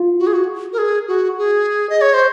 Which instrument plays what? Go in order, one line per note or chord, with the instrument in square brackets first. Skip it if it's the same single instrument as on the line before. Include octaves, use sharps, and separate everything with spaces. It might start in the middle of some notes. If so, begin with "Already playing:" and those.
Already playing: [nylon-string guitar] F4
[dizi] F#4
G#4
F#4
A#4
G#4
F#4
G#4
D#5
C#5
C5